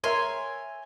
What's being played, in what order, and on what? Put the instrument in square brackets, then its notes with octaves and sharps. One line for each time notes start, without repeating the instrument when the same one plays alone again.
[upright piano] A#4 E5 [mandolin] C#5 G#5 C6